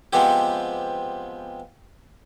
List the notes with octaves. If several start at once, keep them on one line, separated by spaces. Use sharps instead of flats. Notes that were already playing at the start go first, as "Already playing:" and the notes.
F3 G#3 B3 C4 G4